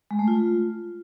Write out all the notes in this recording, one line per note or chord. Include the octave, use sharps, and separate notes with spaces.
G#3
A3
F4